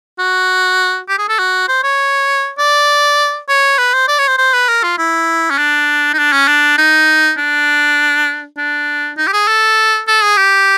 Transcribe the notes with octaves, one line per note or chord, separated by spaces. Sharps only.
F#4
G4
G#4
A4
F#4
C5
C#5
D5
C#5
B4
C5
D5
C#5
C5
C5
B4
A#4
F4
E4
C#4
D4
D#4
D4
C#4
D4
D#4
D4
D4
D#4
G4
G#4
A4
A4
G#4
G4